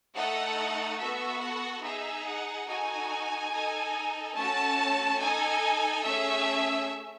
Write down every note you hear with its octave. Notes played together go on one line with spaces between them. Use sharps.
A3 D#4 A4 F#5
B3 F#4 A4 E5
F#5
D#4 G#4 E5
F#5
D#4 F#4 A4 G#5
D#4 A4
A3 C#4 F#4 A5
D#4 A4 G#5
A3 C#4 G#4 E5